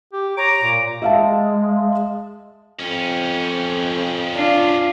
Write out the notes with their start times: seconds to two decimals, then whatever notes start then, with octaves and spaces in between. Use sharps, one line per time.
0.13 G4
0.37 C#5 A#5 D6
0.62 A#2
1.02 G#3 E5 F5 A5
2.79 F2 F3 C#4
4.35 D4 F4